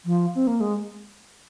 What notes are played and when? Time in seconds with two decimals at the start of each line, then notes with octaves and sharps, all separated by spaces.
0.06 F3
0.35 C4
0.47 A#3
0.60 G#3